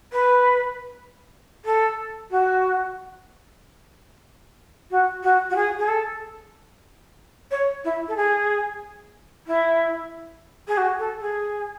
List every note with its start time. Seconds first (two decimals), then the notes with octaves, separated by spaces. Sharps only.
0.13 B4
1.65 A4
2.31 F#4
4.91 F#4
5.23 F#4
5.50 F#4
5.56 G#4
5.79 G#4
5.88 A4
7.51 C#5
7.85 E4
8.08 A4
8.17 G#4
9.47 E4
10.68 G#4
10.77 F#4
10.99 A4
11.21 G#4